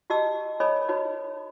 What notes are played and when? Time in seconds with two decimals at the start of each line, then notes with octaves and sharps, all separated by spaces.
0.10 F#4 G4 D#5 A5 E6
0.60 A4 A#4 C#5 D#5 G#5 B5
0.88 D#4 F#4 B4 C#5